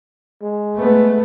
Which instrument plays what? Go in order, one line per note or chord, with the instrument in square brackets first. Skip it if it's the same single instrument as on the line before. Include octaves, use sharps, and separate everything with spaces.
[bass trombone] G#3
[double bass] A3 B3